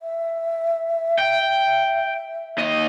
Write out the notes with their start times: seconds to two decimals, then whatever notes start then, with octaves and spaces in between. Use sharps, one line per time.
0.01 E5
1.19 G5
2.58 D#2 D#5